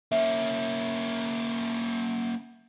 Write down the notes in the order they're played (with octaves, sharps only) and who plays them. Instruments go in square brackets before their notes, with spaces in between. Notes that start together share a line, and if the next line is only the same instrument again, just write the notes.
[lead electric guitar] A#3 C#4 [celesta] E5